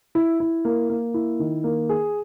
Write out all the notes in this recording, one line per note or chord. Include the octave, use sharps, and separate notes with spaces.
E4
E4
A#3
A#3
E4
D#3
A#3
G#4